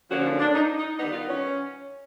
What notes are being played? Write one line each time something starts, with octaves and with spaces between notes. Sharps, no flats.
D3 F3 A#3 C#4 F#4
D4
D4
D#4
D#4
D#3 G3 B3 D#4
F4
C#4